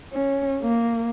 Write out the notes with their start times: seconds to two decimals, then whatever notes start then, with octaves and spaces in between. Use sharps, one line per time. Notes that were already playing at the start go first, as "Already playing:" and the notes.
0.12 C#4
0.62 A#3